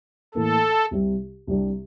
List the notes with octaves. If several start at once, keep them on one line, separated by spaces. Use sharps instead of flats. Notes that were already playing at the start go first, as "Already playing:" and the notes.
A2 E3 A#3 A4
C2 C3 G3
C2 C3 G3 D4